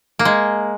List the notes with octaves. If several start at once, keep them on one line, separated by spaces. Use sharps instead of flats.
A#3
G#3